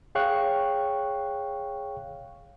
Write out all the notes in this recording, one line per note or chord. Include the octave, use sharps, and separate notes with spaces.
G#4 C#5 F5 G5 C#6 F#6